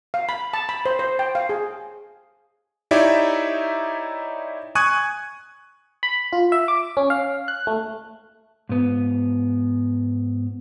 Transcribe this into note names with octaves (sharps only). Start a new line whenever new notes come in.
F5
B5
A5
B5
C5
C5
G5
F5
G#4
D#4 E4 G4 C#5 D5 E5
G#5 C#6 D#6 F#6 G#6 D#7
B5
F4
E5
D6
C#4
F5
F#6
A3
G#2 B3